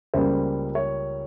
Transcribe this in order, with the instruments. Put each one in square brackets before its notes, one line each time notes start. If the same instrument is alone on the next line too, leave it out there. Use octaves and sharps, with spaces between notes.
[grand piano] C#2 C#3 G3 A#3 C5
C#5